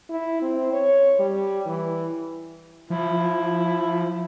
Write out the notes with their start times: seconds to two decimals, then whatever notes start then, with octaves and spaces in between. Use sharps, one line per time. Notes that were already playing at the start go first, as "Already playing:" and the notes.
0.10 E4
0.42 C4
0.73 C#5
1.20 G3
1.66 E3
2.90 F3 E4